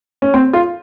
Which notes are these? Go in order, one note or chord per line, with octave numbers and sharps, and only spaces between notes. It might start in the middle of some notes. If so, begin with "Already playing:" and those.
C#4
C4
F4